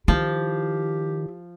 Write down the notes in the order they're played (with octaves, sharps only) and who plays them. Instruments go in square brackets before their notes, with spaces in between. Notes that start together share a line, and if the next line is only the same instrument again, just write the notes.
[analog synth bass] D#3 [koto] F3 [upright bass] E4 [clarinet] G4